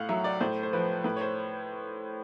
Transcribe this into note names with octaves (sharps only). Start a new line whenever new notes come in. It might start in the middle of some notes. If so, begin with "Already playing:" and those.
Already playing: A2 F5 F#5
F#3 E5
D5
A2 C5
C5
F3 B4
A2 B4
C#5
C5